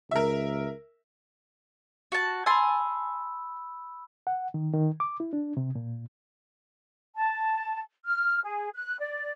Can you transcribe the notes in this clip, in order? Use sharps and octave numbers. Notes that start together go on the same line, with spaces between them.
C#2 A#4 E5
F#4 A5
G#5 A5 B5 C6 E6
F#5
D#3
D#3
D6
E4
D4
C3
A#2
A5
F6
G#4
F#6
D5